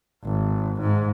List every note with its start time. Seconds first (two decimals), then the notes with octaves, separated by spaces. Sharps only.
0.24 G#1
0.81 G#2